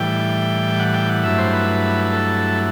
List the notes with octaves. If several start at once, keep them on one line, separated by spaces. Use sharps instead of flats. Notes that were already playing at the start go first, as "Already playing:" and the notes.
Already playing: A2 E3 G3 G5
F#5
G5
F#5
G2 F#3 A3 E4 E5
C5
B4
A4